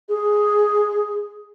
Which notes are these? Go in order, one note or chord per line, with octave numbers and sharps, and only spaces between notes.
G#4